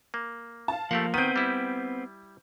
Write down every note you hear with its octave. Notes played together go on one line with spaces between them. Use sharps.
A#3
F5 A5
F3 A3 A#3 G4 F#5
D#3 B3 C4 G6 D#7
G3 E4